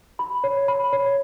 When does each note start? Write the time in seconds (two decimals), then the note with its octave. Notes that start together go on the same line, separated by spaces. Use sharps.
0.19 B5
0.44 C#5
0.68 B5
0.93 C#5